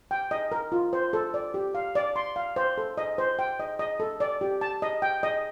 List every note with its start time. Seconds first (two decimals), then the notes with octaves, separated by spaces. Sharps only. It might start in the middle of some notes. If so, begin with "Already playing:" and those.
0.11 G5
0.31 D#5
0.52 A#4
0.72 F4
0.93 C5
1.13 A4
1.34 D5
1.54 G4
1.75 F5
1.95 D5
2.16 C6
2.36 F5
2.56 C5
2.78 A4
2.98 D#5
3.18 C5
3.39 G5
3.60 D#5
3.79 D#5
4.00 A4
4.20 D5
4.41 G4
4.61 A5
4.82 D#5
5.02 G5
5.23 D#5